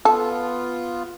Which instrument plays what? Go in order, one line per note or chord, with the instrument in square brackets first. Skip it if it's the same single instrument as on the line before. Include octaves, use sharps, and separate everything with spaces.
[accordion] B3 F4 [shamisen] A4